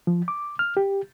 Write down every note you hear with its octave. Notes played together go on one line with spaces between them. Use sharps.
F3
D6
F6
G4